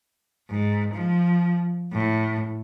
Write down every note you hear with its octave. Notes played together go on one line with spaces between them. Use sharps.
G#2
F3
A2